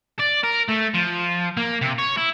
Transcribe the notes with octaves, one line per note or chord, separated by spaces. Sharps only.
D5
A#4
A3
F3
A#3
C3
C#5
E4